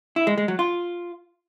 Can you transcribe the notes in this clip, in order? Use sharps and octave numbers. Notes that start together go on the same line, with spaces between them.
E4
G#3
G#3
F#3
F4